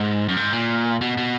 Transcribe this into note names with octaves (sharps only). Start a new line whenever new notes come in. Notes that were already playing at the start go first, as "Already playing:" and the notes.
Already playing: G#2
F#2
G#2
A#2
B2
B2